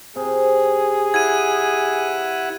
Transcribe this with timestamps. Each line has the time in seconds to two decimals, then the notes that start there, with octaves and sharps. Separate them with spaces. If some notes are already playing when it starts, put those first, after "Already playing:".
0.16 C3 G#4
1.14 E4 F#5 G#6 D#7